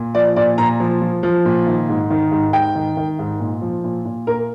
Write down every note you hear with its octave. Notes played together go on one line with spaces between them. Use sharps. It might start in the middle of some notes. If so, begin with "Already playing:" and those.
Already playing: A#2
F3 D5
A#2 D5
A#2 A#5
F3
F3
F3
A#2
D#3
G#2
D#3
G#2
G#2 G5
D#3
D#3
G#2
A#2
F3
A#2
A#2
A#2 A#4